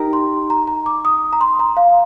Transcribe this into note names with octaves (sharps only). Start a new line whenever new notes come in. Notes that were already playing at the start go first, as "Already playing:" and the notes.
Already playing: D#4 G4 A#4
C6
A#5
A#5
D6
D#6
A#5
C6
A#5
F5